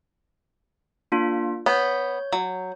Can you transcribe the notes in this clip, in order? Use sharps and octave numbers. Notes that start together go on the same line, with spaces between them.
A#3 D4 F4
B3 C#5 G6
F#3